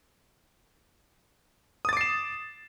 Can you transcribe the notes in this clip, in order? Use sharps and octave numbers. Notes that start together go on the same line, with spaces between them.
D6 D#6 A6 C7 E7